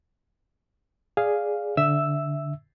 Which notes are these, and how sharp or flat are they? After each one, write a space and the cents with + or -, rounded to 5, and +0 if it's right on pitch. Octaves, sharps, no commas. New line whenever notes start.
G#4 +0 D5 +0 F5 +0
D3 -10 E5 +0 E6 +0